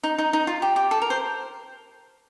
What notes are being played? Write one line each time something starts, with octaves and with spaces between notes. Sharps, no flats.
D#4
D#4
D#4
F4
G4
G4
A4
A#4
C5